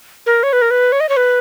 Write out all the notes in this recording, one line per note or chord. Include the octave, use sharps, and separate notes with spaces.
A#4
C#5
B4
A#4
B4
C#5
D#5
C#5
B4